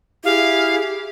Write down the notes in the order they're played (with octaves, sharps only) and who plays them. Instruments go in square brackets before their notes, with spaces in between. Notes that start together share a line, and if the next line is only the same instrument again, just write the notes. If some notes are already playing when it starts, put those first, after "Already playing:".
[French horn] E4 [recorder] G4 [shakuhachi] G#4 [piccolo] F5